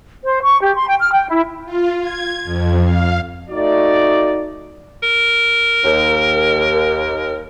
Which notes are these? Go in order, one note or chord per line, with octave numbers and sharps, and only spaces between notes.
C5
C#6
G4
C6
G5
F6
G5
E4
F4
G#6
F2
F5
A3 D#4 F#4 D5
A#4
D#2